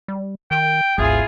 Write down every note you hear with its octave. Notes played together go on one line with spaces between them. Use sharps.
G3
D#3 G5
G#1 D2 E4 F4 G#4